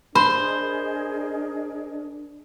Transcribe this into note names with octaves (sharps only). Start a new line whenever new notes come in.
D4 G#4 A#4 C5 D#5 A5 B5